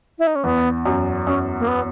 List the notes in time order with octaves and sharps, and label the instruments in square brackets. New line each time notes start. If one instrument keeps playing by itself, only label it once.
[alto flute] E4
D#4
C#4
[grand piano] E2 [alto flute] B3
[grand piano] F#2
[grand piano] F#2 [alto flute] C#4
[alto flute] A#3
B3